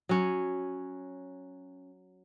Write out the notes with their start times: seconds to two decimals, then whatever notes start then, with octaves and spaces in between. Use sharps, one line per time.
0.09 F#3 C#4